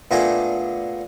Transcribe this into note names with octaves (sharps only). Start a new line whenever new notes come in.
A#2 A3 B3 D4 G#4 G5